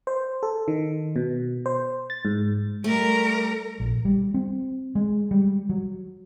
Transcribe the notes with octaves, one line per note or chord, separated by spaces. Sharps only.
C5
A4
D#3
B2
C5
A6
G#2
G3 A3 A#4
A#1
G3
C4
G#3
G3
F#3